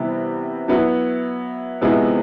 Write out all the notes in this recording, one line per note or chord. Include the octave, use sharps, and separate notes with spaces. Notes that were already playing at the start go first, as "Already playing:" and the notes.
Already playing: C3 E3 G3 B3
F#3 B3 E4
C3 F3 G#3 B3 E4